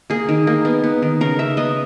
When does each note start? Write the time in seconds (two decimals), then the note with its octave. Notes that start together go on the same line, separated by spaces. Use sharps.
0.10 A#3 G#4
0.29 D#3
0.47 A#3
0.65 B3
0.84 B3
1.02 D#3
1.21 C#3 A#4
1.39 C#3 E5
1.57 B3 D#5